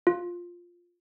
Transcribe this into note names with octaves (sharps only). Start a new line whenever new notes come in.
F4